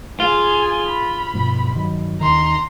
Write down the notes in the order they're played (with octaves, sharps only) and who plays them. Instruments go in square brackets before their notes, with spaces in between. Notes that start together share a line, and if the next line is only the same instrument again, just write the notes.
[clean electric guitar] F4 [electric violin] G#4 G#5
[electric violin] B5
[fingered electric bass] G2 B2 F3
G2 D#3 F#3
[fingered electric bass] D#2 D#3 [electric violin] A#5 C6